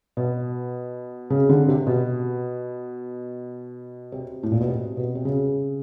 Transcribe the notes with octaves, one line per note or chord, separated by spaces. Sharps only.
B2
C#3
D3
C3
B2
C3
A2
A#2
B2
C3
B2
C3
C#3